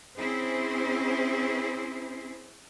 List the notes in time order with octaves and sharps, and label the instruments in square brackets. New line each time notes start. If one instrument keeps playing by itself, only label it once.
[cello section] C4 C#4 E4 G#4 C5